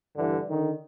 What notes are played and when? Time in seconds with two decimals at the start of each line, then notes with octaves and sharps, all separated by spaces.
0.15 G2 D3 E3
0.48 D3 D#3